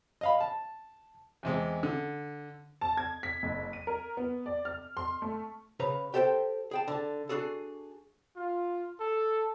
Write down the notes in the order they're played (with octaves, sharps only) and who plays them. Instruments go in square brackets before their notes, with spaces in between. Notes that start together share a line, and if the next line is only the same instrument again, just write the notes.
[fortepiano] D#5 F5 B5
A5
E2 C3 G#3
D3
[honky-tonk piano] A5
G#6
B6
F#1
D#7
A#4
B3
D5
F6
C6
A3
[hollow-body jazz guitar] C#3 B4 C#5 A#5
G4 A4 C5 F#5 G5
G#4 G5 A5
D3 A5
D4 F#4 G#4 A4
[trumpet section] F4
A4